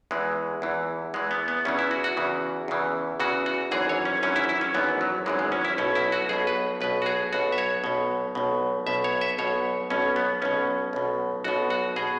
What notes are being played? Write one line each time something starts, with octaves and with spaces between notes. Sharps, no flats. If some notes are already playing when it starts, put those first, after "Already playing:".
E2 E3 G#3
E2 E3
E2 E3 G#3
B3
B3
E2 C#3 E3 C#4
E4
F#4
F#4
E2 C#3 E3
E2 C#3 E3
E2 C#3 E3 F#4
F#4
G#1 F#2 E3 G#4
C#5
C#4
G#1 F#2 E3 C#4
E4
E4
C#4
G#1 F#2 E3 B3
F#3
G#1 F#2 E3 G#3
G#3
C#4
E4
B1 B2 C#4
E4
F#4
B1 B2 G#4
B4
B1 B2 B4
F#4
G#4
B1 B2 F#4
E5
C#5
B1 B2
B1 B2
B1 B2 E5
C#5
E5
B1 B2 C#5
B1 B2 C#4
B3
B1 B2 C#4
B1 B2
B1 B2 F#4
F#4
B2 G#4